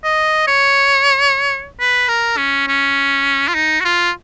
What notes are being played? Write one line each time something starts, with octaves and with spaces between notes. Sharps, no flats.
D#5
C#5
B4
A#4
C#4
C#4
F4
D#4
F#4
F4